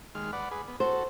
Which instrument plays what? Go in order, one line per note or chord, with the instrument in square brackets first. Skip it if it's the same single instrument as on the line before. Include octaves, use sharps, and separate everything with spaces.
[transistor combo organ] D#2 G#3 F6
B4 D5 F#5
G#4 B4
B3
[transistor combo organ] F#4 A4 [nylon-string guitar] C5